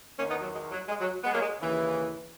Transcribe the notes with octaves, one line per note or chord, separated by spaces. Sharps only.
E2 D#3 A#3 C#4
B3 D#4
F#3
G#3
F#3
G#3
F#3
G#3 B3
F#3 A#3
G#3
D#2 C#3 E3